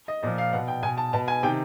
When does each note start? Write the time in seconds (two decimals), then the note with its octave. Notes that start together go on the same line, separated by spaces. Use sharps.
0.08 D#5
0.23 A#2 F3 D#5
0.38 F5
0.53 B2 F#5
0.68 G5
0.83 B2 G#5
0.98 A5
1.13 B2 A5
1.28 G#5
1.43 C3 D#3 G5